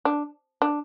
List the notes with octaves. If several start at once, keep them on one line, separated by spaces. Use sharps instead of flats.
D4
D4